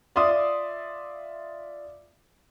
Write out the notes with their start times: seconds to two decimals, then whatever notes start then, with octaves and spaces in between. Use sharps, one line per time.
0.15 F4 D5 E5 C6 D6 D#6